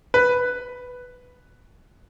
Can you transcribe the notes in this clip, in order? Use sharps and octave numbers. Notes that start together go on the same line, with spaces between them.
B4